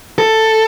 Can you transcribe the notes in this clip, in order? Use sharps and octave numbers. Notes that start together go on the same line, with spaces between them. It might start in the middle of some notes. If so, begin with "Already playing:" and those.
A4